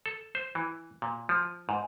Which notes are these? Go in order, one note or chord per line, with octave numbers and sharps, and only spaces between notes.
A4
C5
E3
A#2
F3
G#2